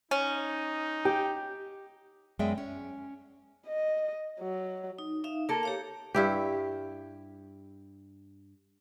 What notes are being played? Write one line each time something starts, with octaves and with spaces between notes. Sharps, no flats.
C#4 D#4
G4
F#2 G#3 B3 D5 E5 G5
C#4
D#5
F#3
D#4
D#4 E5 F5
A#3 A4 A#4
G4 C#5 F5
G2 E4 G4